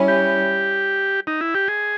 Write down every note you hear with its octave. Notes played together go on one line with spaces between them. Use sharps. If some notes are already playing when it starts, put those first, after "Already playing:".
Already playing: G3 C#4 E4
G4
D#4
E4
G4
G#4